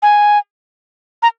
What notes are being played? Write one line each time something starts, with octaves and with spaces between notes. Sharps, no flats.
G#5
A#5